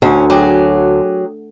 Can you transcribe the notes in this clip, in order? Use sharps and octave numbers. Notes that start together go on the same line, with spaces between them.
D2 C#4
F#3 G4 G#4